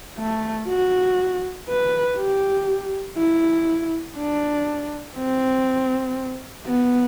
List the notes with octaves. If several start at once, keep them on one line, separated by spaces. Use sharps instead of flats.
A3
F#4
B4
G4
E4
D4
C4
B3